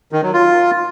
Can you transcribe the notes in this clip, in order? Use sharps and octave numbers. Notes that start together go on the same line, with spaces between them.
D#3
F#3
F4